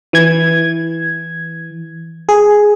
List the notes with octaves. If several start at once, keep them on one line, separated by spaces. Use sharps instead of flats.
E3 G#6
G#4